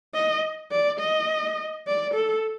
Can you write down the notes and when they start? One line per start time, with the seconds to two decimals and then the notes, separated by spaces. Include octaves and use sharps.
0.15 D#5
0.71 D5
1.00 D#5
1.87 D5
2.15 A4